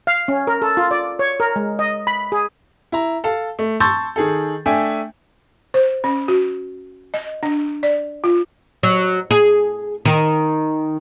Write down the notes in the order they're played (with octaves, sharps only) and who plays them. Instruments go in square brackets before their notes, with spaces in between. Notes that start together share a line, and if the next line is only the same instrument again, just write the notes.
[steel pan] F5
C#4
A#4
A4
F4
D5
C#5
A#4
G#3
D#5
B5
G#4
[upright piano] E4 A#5
A4 F5 A5
A3
A5 C6 C#6 E6 G6 A6
D#3 G#4 A4
A3 D4 E5 G5 G#5
[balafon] C5
C#4
F#4
D#5
D4
D5
F4
[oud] F#3
G#4
D#3